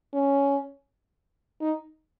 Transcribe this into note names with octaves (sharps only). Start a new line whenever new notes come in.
C#4
D#4